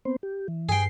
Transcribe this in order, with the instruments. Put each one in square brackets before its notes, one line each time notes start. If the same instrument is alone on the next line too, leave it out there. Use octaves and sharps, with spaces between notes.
[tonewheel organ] B3 C4 C5
G4
E3
[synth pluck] G2 C7 [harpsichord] G#4 G5